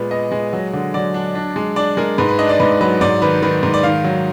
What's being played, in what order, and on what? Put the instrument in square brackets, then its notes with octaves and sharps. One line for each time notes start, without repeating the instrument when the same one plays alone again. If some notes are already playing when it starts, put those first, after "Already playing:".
Already playing: [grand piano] A#2 G#3 B3 B4
B3 D#5
G#3
F#3
D3
F#3 D5
D4
D4
G#3
D4 D5
G#3 A#4
G#2 B4
B4
D4 D#5
D5
G#2 B4
F#3 B4
G#2 D5
D#3 B4
D#3 B4
G#2
D5
D#3 F5
F#3